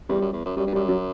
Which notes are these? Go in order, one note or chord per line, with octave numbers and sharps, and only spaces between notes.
E2 G3
F#2
E2
F#2
F#2 G3
G2
F#2 G3
F#3